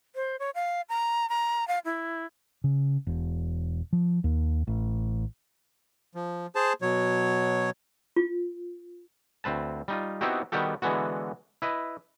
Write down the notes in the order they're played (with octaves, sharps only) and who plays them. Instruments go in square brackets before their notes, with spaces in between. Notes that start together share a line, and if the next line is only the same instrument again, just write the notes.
[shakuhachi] C5
C#5
F5
A#5
A#5
F5
E4
[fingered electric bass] C#3
E1
F3
D#2
A1
[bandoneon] F3
G#4 C5 A5
B2 F#3 C#5
[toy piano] F4
[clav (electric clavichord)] D2 C4 B4 A5
G3 D#4 F4
B3 C4 D#4 E4 F#4 G4
D#3 G3 B3 F#4 G4 A4
D3 E3 G#3 B3 F#4
E4 B4 D#5